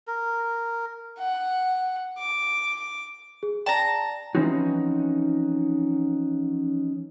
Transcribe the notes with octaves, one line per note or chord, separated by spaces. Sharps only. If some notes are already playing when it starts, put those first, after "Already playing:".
A#4
F#5
D6
G#4
D5 G5 A5 A#5
E3 F3 C4 C#4 D#4 F#4